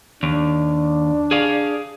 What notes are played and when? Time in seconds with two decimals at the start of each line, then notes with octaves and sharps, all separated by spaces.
0.23 D#2 D4
1.31 G#4 F5